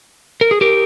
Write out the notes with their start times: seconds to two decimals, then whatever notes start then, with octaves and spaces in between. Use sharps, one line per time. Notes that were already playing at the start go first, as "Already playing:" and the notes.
0.41 A#4
0.51 G#4
0.61 G4 A#4